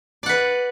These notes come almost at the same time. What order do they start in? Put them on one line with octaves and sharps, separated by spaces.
D5 F#5 B4